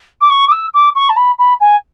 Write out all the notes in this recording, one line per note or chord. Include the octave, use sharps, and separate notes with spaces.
D6
C#6
D6
E6
D6
C#6
A5
B5
B5
G#5